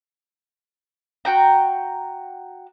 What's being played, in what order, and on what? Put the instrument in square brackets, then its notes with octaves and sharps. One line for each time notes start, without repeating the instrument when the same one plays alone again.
[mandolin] F#4 G5 A#5